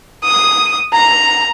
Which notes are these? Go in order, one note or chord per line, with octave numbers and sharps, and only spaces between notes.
D#6
A#5